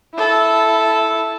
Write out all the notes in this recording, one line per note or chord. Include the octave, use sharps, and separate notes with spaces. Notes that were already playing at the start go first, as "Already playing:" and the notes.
E4 A4